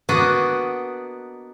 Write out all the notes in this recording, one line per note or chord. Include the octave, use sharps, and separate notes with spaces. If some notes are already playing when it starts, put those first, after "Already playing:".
A#3 B3 D4 F#4 D#5